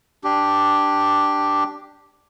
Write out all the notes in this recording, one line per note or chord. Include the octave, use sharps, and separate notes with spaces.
D4 G4